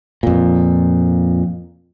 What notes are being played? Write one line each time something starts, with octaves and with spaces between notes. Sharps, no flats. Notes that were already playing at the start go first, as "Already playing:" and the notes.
F2 A#2